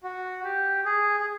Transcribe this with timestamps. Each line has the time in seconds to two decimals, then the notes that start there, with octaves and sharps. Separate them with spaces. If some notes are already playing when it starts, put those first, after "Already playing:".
0.03 F#4
0.44 G4
0.85 G#4
1.20 G#4